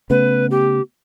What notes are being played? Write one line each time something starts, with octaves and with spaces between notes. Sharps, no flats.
C#3 A3 B3 B4
G4